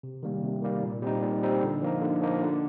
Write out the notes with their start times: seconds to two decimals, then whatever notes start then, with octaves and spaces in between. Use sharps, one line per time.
0.03 C3
0.23 D#3 G3 A#3
0.43 C3
0.62 D#3 G3 A#3
0.83 A#2
1.02 G3 C4 D#4
1.22 A#2
1.43 G3 C4 D#4
1.62 D3
1.82 F3 A#3 D#4
2.02 D3
2.21 F3 A#3 D#4
2.42 D3